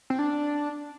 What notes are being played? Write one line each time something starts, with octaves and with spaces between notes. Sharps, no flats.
C4
D4